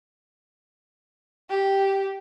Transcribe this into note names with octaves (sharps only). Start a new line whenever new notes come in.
G4